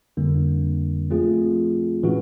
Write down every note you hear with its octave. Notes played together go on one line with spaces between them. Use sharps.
F2 D3 G3 A#3 D4
F3 A3 C4 F4 G#4
A2 E3 G#3 C#4 F#4